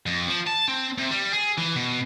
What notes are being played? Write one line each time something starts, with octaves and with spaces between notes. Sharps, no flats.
F2
F3
A5
C4
C3
G3
G#4
E3
B2